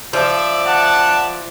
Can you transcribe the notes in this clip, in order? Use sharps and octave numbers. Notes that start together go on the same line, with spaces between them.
F3 D5 E5 E6
F#5 A5